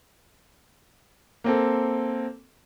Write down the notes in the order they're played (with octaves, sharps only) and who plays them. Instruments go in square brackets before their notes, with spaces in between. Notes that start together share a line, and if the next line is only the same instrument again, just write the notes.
[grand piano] A#3 C4 A4